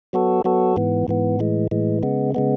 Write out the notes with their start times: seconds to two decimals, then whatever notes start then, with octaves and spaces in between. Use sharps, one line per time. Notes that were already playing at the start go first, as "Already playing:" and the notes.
0.13 F#3 B3 F#4 A4
0.44 F#3 B3 F#4 A4
0.76 G#2 E3 B3
1.08 G#2 E3 B3
1.39 A2 E3 G#3
1.71 A2 E3 G#3
2.03 C#3 G#3 B3
2.35 C#3 G#3 B3